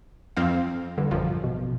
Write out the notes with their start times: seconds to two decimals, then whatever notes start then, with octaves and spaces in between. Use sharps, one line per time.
0.37 F2 C4 F5
0.98 G2 D3
1.11 A1 F#2 F3
1.44 B2